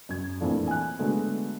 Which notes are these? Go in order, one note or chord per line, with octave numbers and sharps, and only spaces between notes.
F#2 G#6
F2 A#2 E3 A3 A#3 D4
G#5 F#6
D3 F#3 G#3 A3 B3